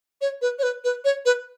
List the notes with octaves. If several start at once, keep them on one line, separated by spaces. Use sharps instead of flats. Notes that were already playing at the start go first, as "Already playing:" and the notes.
C#5
B4
C#5
B4
B4
C#5
B4